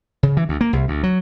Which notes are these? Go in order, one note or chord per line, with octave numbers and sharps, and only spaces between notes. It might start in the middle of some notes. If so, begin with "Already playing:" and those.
C#3
E3
D2
A#3
C2
D2
F#3